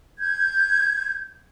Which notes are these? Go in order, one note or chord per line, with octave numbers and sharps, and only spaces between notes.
G6 G#6